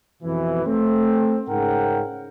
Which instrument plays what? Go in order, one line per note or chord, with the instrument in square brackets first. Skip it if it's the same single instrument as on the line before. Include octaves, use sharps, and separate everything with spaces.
[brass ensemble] F2 B2 E3
A3 C4
G#2 C#3 A#4 F#5 G5